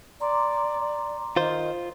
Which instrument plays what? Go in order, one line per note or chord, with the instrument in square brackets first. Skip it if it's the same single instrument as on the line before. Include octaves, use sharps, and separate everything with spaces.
[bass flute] D5 [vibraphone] A#5 C6 D6
[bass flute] D#3 [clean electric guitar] F4 C5